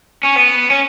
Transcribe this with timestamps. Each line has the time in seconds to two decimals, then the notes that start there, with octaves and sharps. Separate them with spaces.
0.25 C#4
0.37 B3
0.71 C#4